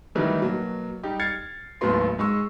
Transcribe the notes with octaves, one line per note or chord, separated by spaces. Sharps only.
D#3 E3 F#3 G3 A3 D#4
B2 F#3 A#3
G3 D#4 G4
F6 G#6 A6 C7 C#7
G#1 D#2 A2 F#3 B3 C6
G#2 G#3 C#6 E6